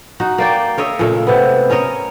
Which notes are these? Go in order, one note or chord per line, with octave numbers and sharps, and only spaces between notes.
D#4 F#4 F#5
A#3 D5 G5
A#4 C#5 D#5 E5
A#2 C#3 G#3 A3
C3 B3
C#4 A#4 C#5 D#5